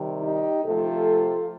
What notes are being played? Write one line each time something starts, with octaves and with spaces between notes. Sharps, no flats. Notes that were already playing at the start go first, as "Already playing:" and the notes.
Already playing: C3 D#3 G3
D#4 G4
C3 F3 A3 F4 A4